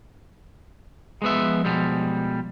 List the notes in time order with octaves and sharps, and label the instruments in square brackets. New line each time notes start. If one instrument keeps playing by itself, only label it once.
[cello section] F3 [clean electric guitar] G#3 B3 E5
[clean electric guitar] B2 G3 G#3